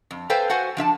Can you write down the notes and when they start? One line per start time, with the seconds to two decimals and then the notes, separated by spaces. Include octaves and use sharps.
0.11 F2
0.30 A4 B4 C5 F5 G5 G#5
0.50 F#4 C5 F#5 G#5
0.77 F3 D4 E5 A5